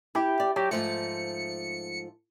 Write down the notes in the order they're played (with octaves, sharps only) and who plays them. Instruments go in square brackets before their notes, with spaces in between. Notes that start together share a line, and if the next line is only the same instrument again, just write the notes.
[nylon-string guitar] E4 [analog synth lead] G4
[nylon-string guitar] D5
[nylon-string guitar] F#3 [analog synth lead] G4
[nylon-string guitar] G#2 F3 A3 [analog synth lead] C#7